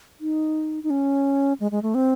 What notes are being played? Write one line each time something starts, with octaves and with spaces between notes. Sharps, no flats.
D#4
D#4
C#4
G#3
G#3
A3
C4